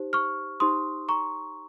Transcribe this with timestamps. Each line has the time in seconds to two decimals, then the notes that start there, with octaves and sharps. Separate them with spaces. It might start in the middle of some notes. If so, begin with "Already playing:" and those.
Already playing: D#4 G4 C5
0.13 C#6 F6
0.60 D#4 G4 C5 C6 D#6
1.09 A#5 C#6